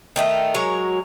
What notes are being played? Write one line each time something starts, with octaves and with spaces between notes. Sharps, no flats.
D#3 A3 D#4
F#3 G#3 A#4 C#5